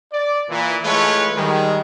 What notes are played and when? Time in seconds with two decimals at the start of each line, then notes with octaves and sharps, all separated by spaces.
0.13 D5
0.49 A#2 E3
0.84 E3 G#3 A3 F4 B4 C#5
1.35 D#3 G3 G#3